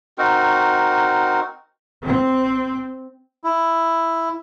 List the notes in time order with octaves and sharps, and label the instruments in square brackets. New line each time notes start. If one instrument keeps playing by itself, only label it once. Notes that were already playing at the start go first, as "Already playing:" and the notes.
[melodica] C4 D#4 F#4 A#4
[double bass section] C4
[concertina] E4